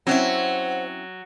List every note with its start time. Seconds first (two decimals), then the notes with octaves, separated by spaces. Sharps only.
0.07 F#3 C4 C#4 E4 C5 F#5